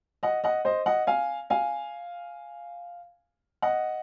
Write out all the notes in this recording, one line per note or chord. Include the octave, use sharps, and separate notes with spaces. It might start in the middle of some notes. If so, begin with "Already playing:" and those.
D#5 F#5
D#5 F#5
C5 D#5
D#5 F#5
F5 G#5
F5 G#5
D#5 F#5